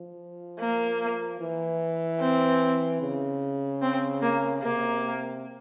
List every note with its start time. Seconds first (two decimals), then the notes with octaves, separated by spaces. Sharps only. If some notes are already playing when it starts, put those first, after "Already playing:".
Already playing: F3
0.59 A#3
1.40 E3
2.20 C4
3.01 C#3
3.82 C4
4.22 A#3
4.62 C3 A#3